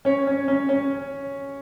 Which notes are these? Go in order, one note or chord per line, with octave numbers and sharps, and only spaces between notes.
C#4 C#5
C#4
C#4
C#4